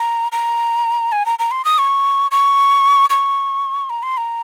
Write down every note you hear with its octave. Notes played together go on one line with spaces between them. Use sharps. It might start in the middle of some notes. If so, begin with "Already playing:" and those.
Already playing: A#5
A#5
G#5
A#5
A#5
C6
D#6
C#6
C#6
C#6
A#5
C6
A#5